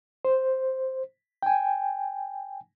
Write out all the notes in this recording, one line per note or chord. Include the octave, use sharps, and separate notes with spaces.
C5
G5 G#5